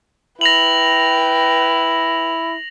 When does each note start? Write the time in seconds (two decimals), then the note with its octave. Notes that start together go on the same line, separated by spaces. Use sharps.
0.41 E4 B4 G5 A#6 F7 F#7